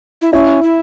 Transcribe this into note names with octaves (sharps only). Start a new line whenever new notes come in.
E4
C#4 E4
E4